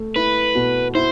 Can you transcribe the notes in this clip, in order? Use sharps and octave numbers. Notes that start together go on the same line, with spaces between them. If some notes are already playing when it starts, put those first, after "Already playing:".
Already playing: A3
E4 B4
B2
E4 C5